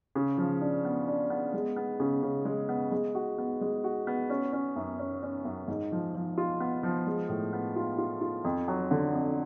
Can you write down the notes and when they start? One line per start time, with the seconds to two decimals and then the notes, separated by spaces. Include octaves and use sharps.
0.15 C#3
0.38 F3
0.61 D4
0.85 B3
1.08 D4
1.30 B3
1.54 G#3
1.76 B3
2.00 C#3
2.23 C#3
2.45 G#3
2.69 B3
2.92 G#3
3.15 F#4
3.38 B3
3.61 G#3
3.84 F#4
4.07 B3
4.30 C#4
4.53 C#4
4.76 F#2
4.99 C#4
5.23 C#4
5.45 F#2
5.68 G#2
5.92 F3
6.15 F3
6.38 F4
6.60 B3
6.83 F3
7.07 G#3
7.29 A2
7.53 B3
7.76 F4
7.98 F4
8.21 F4
8.45 F2
8.68 F#3
8.91 D3
9.14 F2